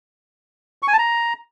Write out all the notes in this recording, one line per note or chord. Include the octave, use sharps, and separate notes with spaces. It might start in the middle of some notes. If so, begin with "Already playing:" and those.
C#6
G#5
A5
A#5